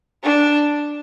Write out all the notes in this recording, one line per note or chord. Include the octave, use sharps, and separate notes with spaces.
D4